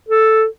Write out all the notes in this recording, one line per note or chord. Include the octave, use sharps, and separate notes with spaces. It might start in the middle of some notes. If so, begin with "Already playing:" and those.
A4